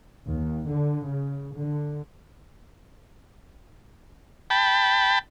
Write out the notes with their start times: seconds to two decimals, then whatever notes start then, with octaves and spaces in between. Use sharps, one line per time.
0.31 D#2
0.69 D3
1.09 C#3
1.55 D3
4.50 G5 A5 B5